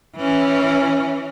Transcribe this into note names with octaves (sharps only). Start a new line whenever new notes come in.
E3 C#4